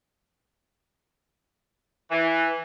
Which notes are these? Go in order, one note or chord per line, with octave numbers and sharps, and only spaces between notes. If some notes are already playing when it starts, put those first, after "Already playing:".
E3